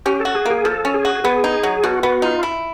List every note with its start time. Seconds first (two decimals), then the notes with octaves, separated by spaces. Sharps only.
0.06 C#4 G4
0.20 A4
0.25 F#4
0.35 G#4
0.46 A#3 G#4
0.65 F3 A4
0.85 C#4
0.94 G#4
1.05 F#4
1.24 B3 G#4
1.44 D#4
1.63 F#3
1.83 B2 F#4
2.03 B3 F#4
2.22 D#4 F4
2.43 E4